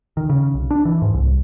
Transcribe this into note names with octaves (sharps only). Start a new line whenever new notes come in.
D#3
C#3
B1
D4
E3
G#2
C2